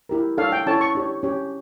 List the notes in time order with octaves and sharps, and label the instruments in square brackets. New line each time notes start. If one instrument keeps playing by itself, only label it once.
[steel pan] E4 G4 A#4
D4 A4 C#5 F5
G5
C#4 E4 A4 C#5 A5
C#6
D4 G4 C#5
C#4 G4 C#5